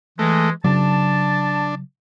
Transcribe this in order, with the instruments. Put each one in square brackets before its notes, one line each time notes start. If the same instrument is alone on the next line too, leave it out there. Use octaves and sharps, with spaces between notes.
[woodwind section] E3 G#3 [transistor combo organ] A3
[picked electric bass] C#3 F#3 [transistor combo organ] D4 [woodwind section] A5